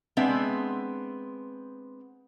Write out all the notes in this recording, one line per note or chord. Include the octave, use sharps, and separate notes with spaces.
G#3 B3 C4 D4 E5